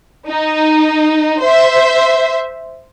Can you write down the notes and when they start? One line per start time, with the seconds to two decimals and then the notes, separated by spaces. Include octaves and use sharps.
0.28 D#4
1.42 C5 E5